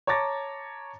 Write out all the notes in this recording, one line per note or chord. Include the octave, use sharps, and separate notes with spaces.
C#5 A5 A#5 D6 A6 A#6